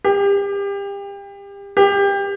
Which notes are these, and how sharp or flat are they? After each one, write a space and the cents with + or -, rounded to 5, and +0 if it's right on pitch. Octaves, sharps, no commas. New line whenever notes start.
G4 +30
G4 +25